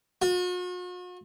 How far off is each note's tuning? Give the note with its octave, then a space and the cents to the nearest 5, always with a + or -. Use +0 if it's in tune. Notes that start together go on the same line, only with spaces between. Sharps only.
F#4 -45